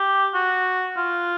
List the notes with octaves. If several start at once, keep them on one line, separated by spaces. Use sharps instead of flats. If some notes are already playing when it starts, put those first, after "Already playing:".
Already playing: G4
F#4
F4